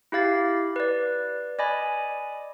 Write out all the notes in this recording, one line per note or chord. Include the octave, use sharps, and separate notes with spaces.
E4 G4 F5 A6
B4 D5
D5 D#5 G#5 B5